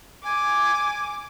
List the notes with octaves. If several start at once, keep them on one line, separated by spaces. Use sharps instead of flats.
G#5 D6